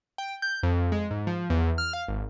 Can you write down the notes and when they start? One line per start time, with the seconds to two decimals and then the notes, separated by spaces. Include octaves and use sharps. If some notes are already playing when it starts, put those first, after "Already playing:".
0.18 G5
0.42 G6
0.63 F2
0.92 G#3
1.11 G#2
1.27 F3
1.50 E2
1.78 F6
1.93 F5
2.08 G#1